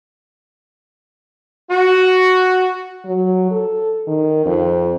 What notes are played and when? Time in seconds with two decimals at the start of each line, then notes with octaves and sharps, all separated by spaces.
1.70 F#4
3.06 F#3
3.51 A4
4.07 D#3
4.46 F2